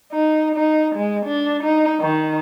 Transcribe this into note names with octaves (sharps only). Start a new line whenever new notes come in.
D#4
D#4
G#3
D4
D#4
D#3